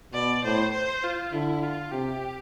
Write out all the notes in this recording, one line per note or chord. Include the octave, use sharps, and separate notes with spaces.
B2 D5
A2 C5
C5
F4
D3 E4
F4
C3 G4